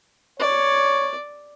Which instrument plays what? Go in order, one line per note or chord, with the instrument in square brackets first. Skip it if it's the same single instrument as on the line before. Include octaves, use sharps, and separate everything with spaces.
[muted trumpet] C#5 [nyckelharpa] D5